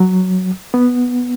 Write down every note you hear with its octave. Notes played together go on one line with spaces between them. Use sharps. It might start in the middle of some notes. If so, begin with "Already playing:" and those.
Already playing: F#3
B3